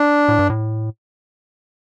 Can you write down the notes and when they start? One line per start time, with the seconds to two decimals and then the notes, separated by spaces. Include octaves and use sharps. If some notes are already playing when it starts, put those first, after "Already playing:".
Already playing: D4
0.28 A2
0.39 G2
0.50 A2